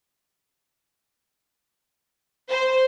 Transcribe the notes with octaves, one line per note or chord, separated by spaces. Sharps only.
C5